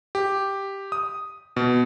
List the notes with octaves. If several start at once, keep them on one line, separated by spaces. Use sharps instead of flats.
G4
D#6
B2